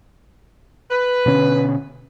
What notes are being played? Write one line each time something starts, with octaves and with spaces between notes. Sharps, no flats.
B4
B2 D3 C#4